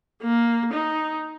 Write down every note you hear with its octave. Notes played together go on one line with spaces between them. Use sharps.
A#3
D#4